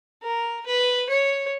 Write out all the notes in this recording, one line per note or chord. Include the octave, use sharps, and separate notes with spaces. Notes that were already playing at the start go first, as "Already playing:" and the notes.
A#4
B4
C#5